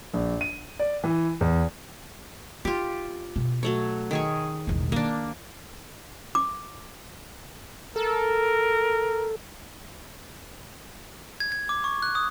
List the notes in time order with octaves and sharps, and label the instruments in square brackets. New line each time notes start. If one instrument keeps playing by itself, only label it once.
[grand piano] A#1
D#7
D5
E3
E2
[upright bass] D#4 [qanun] F4 G4
[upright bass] B2
[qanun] F#3 A3 C#5
D#3 G#4 C#6
[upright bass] E1 A1
[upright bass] D#3 [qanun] A#3 D4
[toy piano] D6
[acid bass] A4 [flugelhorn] A#4
[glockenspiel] G#6
G#6
D6
C#6
F#6
D#6